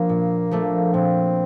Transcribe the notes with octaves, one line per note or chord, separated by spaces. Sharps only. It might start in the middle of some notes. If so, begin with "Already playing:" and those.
Already playing: F3 A#3 D4
A#2
F3 A3 D4
A#2 C4